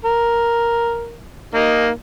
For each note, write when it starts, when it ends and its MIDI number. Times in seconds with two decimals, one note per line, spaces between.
0.05 1.16 70
1.55 1.89 58
1.55 1.89 63